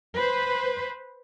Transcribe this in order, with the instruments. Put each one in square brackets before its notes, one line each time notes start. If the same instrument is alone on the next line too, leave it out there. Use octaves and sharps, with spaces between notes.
[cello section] B4 C5